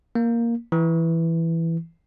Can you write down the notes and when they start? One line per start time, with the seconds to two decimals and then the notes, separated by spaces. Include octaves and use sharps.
0.15 A#3
0.72 E3